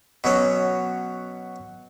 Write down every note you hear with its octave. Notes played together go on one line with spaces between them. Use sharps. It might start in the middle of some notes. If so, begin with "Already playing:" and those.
B2 F#3 C#4